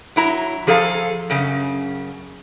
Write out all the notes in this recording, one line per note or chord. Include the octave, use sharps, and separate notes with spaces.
F#3 E4 A#5
F3 G#4 A4 C5 F5 A#5
F#2 C#3